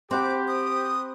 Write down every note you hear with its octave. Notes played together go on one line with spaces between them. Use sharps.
C4 G4 C5 F#5 B5 D6
D#6